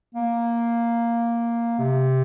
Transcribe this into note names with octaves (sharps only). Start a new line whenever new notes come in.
A#3
C3